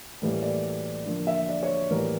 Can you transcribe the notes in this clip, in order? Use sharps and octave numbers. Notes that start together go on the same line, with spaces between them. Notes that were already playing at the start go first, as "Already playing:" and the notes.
A2 E3 G3 A#3
D5
D3 F3 A#3
E5
D5
C#5
A2 E3 G3 A#3 A#4